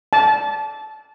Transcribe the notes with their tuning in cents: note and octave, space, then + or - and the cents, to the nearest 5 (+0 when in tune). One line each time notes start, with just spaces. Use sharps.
A5 -20